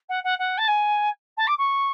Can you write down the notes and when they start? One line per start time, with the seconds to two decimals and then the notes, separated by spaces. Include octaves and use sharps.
0.09 F#5
0.24 F#5
0.38 F#5
0.57 A5
0.67 G#5
1.37 A5
1.47 D6
1.58 C#6